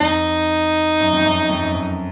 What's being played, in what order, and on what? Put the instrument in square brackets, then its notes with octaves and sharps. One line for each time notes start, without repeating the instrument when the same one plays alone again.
[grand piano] F2 [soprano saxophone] D#4
[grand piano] F#2
F2
F#2
F2
F#2
F#2